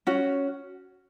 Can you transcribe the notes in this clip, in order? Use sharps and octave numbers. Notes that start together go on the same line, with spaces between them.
C#4 F#4